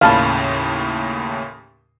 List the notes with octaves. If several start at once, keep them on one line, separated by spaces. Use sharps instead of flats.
D#2 A2 C#3 F5 A5 B5